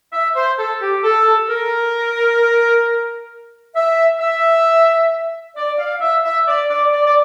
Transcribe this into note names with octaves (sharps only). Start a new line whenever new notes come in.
E5
C5
A4
G4
A4
A#4
E5
E5
D5
F5
E5
E5
D5
D5
D5
D5